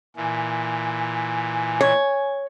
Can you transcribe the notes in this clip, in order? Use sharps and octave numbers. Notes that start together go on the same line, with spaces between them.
A#2 E3 G#5
C#5